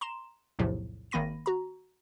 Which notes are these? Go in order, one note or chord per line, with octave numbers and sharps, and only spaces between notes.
A#5 C6 E7
B1 E2 A2 C3 F3
G#1 D#3 A#3 B5 A#6 D#7
F#4 A#5